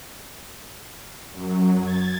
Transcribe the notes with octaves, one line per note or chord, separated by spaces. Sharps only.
F#2 F#3
G#6 A6